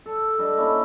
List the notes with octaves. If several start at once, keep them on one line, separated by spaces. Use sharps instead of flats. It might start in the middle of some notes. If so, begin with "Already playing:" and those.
A4
G3 D4 A4 D#5
A#3 C#4 E4